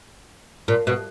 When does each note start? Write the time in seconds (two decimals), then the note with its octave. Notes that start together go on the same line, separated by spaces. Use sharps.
0.68 A#2
0.87 B2